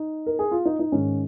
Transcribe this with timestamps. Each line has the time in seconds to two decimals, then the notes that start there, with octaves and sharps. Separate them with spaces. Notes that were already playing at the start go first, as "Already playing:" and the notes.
Already playing: D#4
0.26 A#4
0.39 G#4
0.51 F4
0.65 D#4
0.79 D#4
0.92 G#2 D#3 C#4